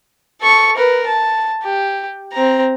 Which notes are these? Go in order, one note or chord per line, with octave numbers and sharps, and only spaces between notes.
A4 C#6
A#4 B4
A5
G4
C4 A#5